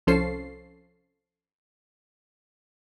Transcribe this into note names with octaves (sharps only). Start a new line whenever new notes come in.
C2 F3 C#4 A4 C5 C7